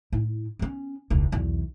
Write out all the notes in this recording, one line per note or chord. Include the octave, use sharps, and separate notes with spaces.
A2 E4
B3 C#4
E1 C#2
B1 E2